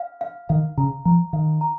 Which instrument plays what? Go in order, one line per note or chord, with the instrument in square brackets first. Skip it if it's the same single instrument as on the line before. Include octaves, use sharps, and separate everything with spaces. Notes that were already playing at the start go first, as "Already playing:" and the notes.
Already playing: [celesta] F5
F5
[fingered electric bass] D#3 [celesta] F5
[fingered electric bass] C#3 [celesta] A#5
[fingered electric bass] F3 [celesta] A#5
[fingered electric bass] D#3 [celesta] F5
[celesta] A#5